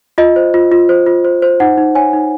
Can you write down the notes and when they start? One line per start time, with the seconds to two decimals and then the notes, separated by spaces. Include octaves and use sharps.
0.18 F4 D#5
0.36 C5
0.54 F4
0.72 F4
0.89 C5
1.06 F4
1.25 C5
1.42 C5
1.60 D#4 F#5
1.78 D#4
1.95 C#5 G#5
2.13 D#4